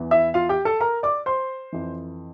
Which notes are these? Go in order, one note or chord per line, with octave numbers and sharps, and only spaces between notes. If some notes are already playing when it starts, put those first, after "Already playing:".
Already playing: E2 E3
E4 E5
F4 F5
G4 G5
A4 A5
A#4 A#5
D5 D6
C5 C6
F2 E3